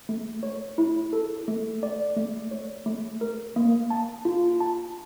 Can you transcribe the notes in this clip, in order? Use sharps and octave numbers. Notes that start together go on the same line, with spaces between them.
A3
C#5
E4
A4
A3
D5
A3
C#5
A3
A#4
A#3
A5
F4
A5